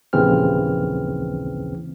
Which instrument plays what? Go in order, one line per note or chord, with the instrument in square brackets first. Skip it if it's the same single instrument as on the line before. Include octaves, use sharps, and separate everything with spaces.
[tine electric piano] A#1 D#2 C#3 E3 C4 F6